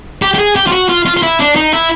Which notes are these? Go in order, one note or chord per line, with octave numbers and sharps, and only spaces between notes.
G4
G4
G#4
G4
F4
F#4
F4
F4
F4
E4
D4
D#4
E4